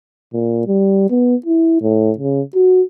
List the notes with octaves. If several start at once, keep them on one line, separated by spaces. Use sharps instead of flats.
A#2
G3
B3
E4
A2
C#3
F#4